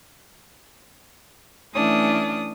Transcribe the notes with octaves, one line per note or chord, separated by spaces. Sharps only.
E3 A3 C#4 D4 D#6